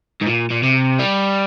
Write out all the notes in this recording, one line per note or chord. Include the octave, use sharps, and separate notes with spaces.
G#2
A#2
A#2
C3
G3